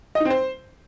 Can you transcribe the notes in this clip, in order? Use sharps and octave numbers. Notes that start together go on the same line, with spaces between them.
D#5
D#4
C4
C5